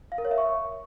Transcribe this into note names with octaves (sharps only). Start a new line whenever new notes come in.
F5
A#4
C#5
E5
C#6